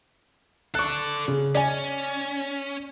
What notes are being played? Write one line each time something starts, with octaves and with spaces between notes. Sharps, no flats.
A4 D5 C#6 F#6
C#3
C#4 D5 G#5